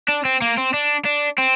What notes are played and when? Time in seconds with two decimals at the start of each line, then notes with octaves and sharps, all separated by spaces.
0.09 D4
0.25 C4
0.42 A#3
0.58 C4
0.74 D4
1.05 D4
1.38 C4